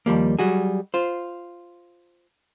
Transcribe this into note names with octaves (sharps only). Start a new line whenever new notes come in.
D#2 F3 G3 A#3
F#3 G3 F#4 G#4
F4 C5